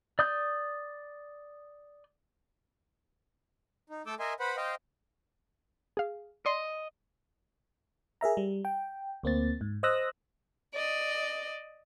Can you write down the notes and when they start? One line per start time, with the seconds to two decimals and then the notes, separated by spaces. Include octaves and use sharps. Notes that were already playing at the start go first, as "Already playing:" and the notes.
0.19 D5 D#6 G6
3.90 D#4
4.06 A3 A4 D6 E6 G6
4.19 A#4 D#5 E5 G#5 C6
4.40 B4 C5 F#5 B5
4.57 C5 D#5 F5 G5
5.97 G#4 F5
6.46 D5 D#5 C6
8.21 G#4 A#4 E5 A#5
8.37 G3
8.65 G5
9.23 D2 A#3 C4 A6
9.61 G#2
9.83 C5 D#5 D#6 E6 F#6 A#6
10.74 D5 D#5